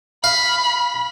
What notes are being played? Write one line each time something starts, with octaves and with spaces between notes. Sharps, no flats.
F5 B5